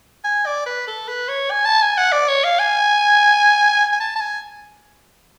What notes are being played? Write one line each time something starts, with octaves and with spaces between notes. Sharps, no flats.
G#5
D5
B4
A4
B4
C#5
G#5
A5
G#5
F#5
D5
C#5
F5
G#5
G#5
A5
A5
G#5